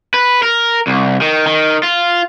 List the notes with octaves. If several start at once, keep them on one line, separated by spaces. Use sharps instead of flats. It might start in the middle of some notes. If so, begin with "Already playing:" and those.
B4
A#4
C2
D#3
D#3
F4